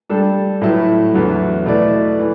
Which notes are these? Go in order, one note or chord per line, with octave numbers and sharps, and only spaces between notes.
G3 D4 A4
A2 F#3 A3 E4 B4
E2 D3 F#3
B2 A3 E4 B4 D5
E3